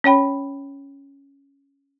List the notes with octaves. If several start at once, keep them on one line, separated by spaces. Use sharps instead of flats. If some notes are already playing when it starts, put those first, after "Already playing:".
C#4 C#5 G5 B5